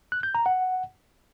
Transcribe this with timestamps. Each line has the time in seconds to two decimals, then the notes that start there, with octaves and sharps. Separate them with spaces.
0.12 F#6
0.23 G6
0.35 A#5
0.46 F#5